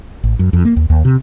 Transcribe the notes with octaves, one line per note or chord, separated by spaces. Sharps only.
A1
F#2
F2
A#3
D#2
D#2
C3